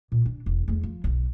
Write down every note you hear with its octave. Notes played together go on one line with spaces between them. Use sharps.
A#2
D4
E1
E2 A3
F3
D#1 B1